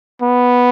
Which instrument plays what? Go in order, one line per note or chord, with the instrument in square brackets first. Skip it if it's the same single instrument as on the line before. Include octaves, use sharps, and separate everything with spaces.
[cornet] B3